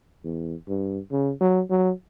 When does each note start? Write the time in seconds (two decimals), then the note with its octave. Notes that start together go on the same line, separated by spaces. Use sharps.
0.24 E2
0.68 G2
1.11 C#3
1.41 F#3
1.70 F#3